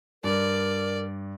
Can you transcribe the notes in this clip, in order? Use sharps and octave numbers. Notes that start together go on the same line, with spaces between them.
G2 A#4 D5